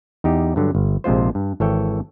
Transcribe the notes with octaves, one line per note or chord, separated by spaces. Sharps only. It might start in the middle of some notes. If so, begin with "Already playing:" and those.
E2 D#4 G4
G2 D3 F#3
G1
A#1 C3 G#3 F4 C5
G2
G#1 E3 A4 C#5 E5 G5